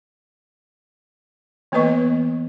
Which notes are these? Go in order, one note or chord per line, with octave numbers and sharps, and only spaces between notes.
E3 A#3 B3 B4 D#5 C#6